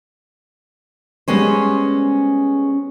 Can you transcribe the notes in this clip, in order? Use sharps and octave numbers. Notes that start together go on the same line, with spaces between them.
G3 G#3 B3 C#4 C5